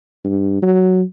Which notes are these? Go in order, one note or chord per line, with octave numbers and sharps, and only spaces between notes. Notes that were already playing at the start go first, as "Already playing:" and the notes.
G2
F#3